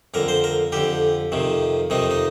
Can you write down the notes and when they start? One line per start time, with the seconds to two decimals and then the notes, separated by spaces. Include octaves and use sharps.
0.14 F2 D3 A#4
0.28 C5
0.44 A#4
0.72 F2 D3 G4
1.32 F2 C3 D#3
1.90 F2 C3 D#3 D#4
2.11 D#4